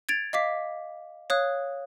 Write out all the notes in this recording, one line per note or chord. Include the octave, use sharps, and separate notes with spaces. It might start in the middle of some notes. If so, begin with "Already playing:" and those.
G#6 A6 D7 F7
D#5 F5 D6 B6
C#5 F5 D#6 F#6